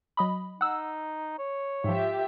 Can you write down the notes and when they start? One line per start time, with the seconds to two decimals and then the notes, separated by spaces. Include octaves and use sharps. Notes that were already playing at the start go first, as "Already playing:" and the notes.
0.17 F#3 D#5 B5
0.61 D#4 F#5 E6
1.39 C#5
1.84 G#2 F3 F4 G4 E5